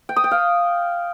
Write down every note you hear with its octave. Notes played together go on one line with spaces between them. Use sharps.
G5
D#6
G5
F5